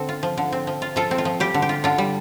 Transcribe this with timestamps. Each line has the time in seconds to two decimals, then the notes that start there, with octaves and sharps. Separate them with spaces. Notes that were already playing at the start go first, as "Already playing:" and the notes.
Already playing: D3 C4 A4
0.09 F4
0.23 F3
0.37 D3
0.52 C4
0.67 F3
0.82 F4
0.96 F3 F4 A4
1.11 C4
1.18 F4
1.25 F3
1.40 G3 G4
1.54 D3
1.62 G4
1.69 F4
1.84 D3 F4
1.98 G3